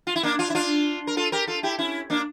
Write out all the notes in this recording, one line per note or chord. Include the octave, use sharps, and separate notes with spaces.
F4
E4
A#3 D4
D4 F4
E4
D4 F4
A#4
F4 A4
G4 A#4
F4 A4
E4 G4
C#4 E4
A#3 D4